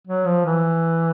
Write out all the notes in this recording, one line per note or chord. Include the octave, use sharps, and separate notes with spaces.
F#3
F3
E3